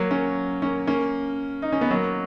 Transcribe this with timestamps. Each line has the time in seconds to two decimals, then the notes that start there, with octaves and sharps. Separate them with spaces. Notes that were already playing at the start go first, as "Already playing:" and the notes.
Already playing: F#3 A#3
0.11 A#3 C#4
0.62 A#3 C#4
0.87 A#3 C#4
1.62 D#4
1.73 C#4
1.81 B3
1.90 F#3 A#3